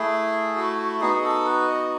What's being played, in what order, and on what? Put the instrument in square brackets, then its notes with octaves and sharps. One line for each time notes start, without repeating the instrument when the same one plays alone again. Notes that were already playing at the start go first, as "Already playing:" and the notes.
Already playing: [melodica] A3 E4 G#4
F#4
F#4
B3 D#4 F#4 G#4
G#4
A4
B4
D#5